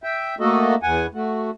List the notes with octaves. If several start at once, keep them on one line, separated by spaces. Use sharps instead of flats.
E5 G5
A3 A#3 F#4 A4 D#5
E2 F#5 G#5
A3 F#4